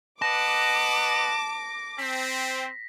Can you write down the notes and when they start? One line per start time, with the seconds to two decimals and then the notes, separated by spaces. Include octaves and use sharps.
0.22 B4 D#5 F#5 A5 D6 A#6
1.98 C4 B6